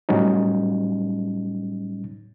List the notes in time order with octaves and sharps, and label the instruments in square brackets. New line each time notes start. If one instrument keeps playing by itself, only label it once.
[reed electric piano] A2 F#3 G3 C#4 D#4